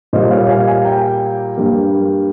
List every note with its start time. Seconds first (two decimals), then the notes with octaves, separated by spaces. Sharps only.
0.13 A#2 G3 A#3 C5 D#5
0.31 C#5 F5
0.49 F5 G#5
0.67 F5 G#5
0.85 G5 A#5
1.57 G2 G3 A#3